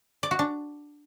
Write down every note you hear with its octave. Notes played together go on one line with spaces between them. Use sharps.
D5
F#4
D4